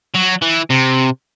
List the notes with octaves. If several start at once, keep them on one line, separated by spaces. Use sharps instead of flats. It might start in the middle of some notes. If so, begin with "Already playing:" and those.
F#3
E3
C3